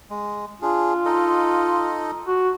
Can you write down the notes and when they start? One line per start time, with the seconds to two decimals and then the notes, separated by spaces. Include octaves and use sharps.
0.10 G#3
0.62 D4 F4 G#4
1.05 D#4 A4 D#5
2.28 F#4